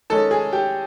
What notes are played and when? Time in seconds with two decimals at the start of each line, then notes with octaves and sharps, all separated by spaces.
0.10 D#3 G#3 C#4 A4 A5
0.31 G#4 G#5
0.52 G4 G5